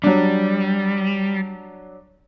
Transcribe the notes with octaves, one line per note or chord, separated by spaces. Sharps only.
F#3 G3 D4